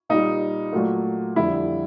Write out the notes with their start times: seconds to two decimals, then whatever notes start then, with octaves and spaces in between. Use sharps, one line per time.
0.09 A#2 G3 D#4
0.73 A#2 F#3 A3
1.36 F2 D3 G3 E4